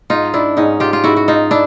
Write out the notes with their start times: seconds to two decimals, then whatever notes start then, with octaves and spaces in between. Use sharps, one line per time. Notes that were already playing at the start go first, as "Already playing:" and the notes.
0.10 G#2 D#4 F4
0.34 D4 E4
0.57 G#2 C#4 D#4
0.80 F4 G4
0.93 F4
1.04 G#2 E4 F#4
1.16 F#4
1.28 D#4 F4
1.51 D4 E4